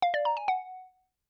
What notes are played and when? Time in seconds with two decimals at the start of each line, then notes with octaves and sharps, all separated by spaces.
0.02 F5
0.14 D5
0.25 A#5
0.37 G#5
0.48 F#5